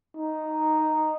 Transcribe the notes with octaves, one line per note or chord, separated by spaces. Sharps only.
D#4